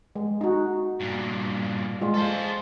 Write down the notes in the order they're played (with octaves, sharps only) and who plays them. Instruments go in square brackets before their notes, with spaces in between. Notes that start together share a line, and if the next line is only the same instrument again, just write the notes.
[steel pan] G#3
D#4 F#4
[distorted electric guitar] G2 A#2
[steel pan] G#3 F4
[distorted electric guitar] A4 C5